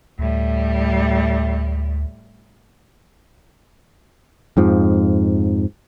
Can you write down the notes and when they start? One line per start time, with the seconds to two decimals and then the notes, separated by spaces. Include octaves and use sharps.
0.19 D2 A2 G3
4.57 F2 G#2 F3